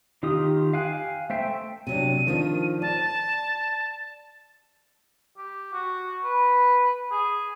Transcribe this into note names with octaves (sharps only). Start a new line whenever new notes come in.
D#3 F4 G4 D#6
F5 G5 G#5 F#6
A3 C5 E5 G5
C3 F#3 D4 D#7
D#3 F3 D4
D5 A5
G4
F#4
B4
G#4